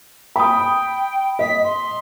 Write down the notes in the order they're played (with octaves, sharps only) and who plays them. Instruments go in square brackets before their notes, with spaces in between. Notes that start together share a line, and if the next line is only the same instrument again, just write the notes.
[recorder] G5 [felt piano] B5 D#6
[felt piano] D#5 [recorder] B6
[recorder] C6